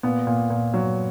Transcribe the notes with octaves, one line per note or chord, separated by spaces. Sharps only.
A#2 B3
A#2
A#2
F#3